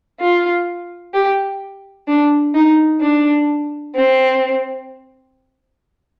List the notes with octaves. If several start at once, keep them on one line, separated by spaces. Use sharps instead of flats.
F4
G4
D4
D#4
D4
C4